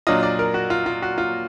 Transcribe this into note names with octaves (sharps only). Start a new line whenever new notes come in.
A#2 F#3 D4 F4 D#5
D5
A#4
F#4
F4
F4
F#4
F4